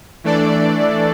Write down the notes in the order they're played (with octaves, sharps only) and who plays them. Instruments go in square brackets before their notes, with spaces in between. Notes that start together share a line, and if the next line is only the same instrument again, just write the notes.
[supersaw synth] E3 A3 D4 A4 D5